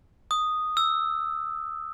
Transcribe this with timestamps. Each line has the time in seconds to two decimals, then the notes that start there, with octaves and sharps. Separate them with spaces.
0.31 D#6
0.77 E6